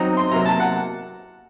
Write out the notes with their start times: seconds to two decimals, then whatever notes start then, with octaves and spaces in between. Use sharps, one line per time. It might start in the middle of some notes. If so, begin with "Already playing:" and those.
Already playing: F#3 C4 D#4 A#5
0.17 C6
0.31 C3 F#3 A#3 A#5
0.45 A5
0.60 F#5